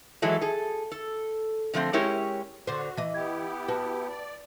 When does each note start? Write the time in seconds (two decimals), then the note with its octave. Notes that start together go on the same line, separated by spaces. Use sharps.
0.22 E3 F#3 G#3 E4 A4
0.41 G#4 A4
0.92 A4
1.74 D3 F3 A3 B3 C4
1.93 G#3 C#4 E4 G4 A#4 C#5
2.67 D3 F#4 C5
2.97 E3 D#5
3.14 B3 E4 G4 G#6
3.68 F#4 B4 A5
4.09 D5